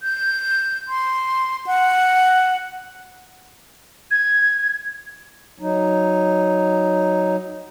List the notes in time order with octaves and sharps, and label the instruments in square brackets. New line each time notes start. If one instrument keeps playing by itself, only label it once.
[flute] G6
C6
F#5
[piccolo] G#6
[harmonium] F#3 D#4